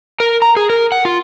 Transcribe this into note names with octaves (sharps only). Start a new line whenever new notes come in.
A#4
A#5
G#4
A#4
F#5
F4